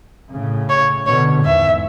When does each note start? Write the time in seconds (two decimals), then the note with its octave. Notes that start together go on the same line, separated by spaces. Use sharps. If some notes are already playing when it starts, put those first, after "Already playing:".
0.31 A2 C#3
0.70 C#5
1.07 B2 D3 C#5
1.45 E2 G#2 E5